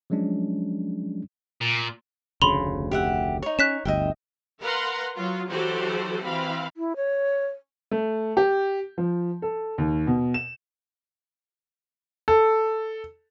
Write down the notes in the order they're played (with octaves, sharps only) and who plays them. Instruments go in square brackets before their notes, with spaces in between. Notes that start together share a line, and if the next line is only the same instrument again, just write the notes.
[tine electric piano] F3 F#3 G#3 C#4 D4
[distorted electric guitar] A#2
[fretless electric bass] F1 D2 C#3 [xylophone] B5 C6 F7
[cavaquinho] G4 E5 F#5
D#4 C#5
[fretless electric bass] C#4 [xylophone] F#6 B6 E7
[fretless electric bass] G1 D2 [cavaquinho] D#5 E5 G5
[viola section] A#4 B4 F5 F#5 A#5 C6
F#3 F4
E3 F#3 F#4 G4 A4 C5
E3 C4 F5 B5
[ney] E4
C#5
[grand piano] A3
G4
F3
A4
D#2
B2
E7
[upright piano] A4